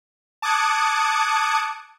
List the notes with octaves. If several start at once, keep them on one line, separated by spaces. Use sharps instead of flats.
A5 D6 D#6 F#6 G#6 C#7